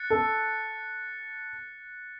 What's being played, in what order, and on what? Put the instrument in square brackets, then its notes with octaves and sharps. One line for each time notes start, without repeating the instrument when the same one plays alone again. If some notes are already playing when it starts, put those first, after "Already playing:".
Already playing: [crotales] F#6 A6 C#7
[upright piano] A4